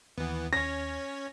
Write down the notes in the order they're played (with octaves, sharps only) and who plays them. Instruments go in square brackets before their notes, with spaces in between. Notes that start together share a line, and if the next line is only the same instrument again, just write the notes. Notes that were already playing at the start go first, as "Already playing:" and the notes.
[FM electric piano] D#2 [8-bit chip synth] E3 B3
[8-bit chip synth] C#4 C#5 [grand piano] A#6